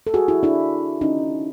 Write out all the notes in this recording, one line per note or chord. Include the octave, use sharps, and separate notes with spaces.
A4
F#4 G#4
E4 F#4
D4 E4
C#4 D#4